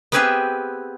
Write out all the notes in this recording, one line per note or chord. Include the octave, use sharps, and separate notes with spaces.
B3 C4 G4 G#4 B4 E5